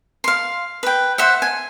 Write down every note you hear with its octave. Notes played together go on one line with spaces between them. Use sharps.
F5 C6
B4 G5
C5 E5 F#5
G#5